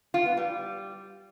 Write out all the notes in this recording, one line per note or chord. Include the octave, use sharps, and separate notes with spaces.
F4
B3
G3